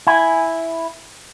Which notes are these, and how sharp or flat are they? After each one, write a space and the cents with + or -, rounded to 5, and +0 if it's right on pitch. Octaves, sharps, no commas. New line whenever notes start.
E4 +0 G#5 +0